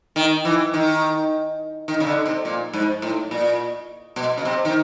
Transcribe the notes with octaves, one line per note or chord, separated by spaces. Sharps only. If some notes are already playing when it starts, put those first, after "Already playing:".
D#3
E3
D#3
D#3
C#3
D3
C3
A#2
G#2
A2
A#2
B2
C#3
C3
D#3